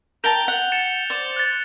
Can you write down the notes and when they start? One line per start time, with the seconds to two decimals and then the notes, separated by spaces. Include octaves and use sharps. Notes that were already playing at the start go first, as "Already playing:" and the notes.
0.24 A#4 G5 A5 G6 F7 G7
0.48 F#5
0.72 A6 C#7 E7
1.10 C5 D5
1.36 F#6 A6